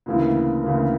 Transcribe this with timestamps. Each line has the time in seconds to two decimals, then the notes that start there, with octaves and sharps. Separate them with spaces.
0.06 D2 C#3 E3 A#3 E4
0.64 D2 C#3 E3 A#3 E4